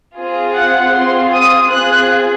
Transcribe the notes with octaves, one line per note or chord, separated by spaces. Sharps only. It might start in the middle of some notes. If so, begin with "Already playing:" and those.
C4 F4 G#4
F#5
C4 F4 G#4 C6
D#6
C4 F4 G#4 F#6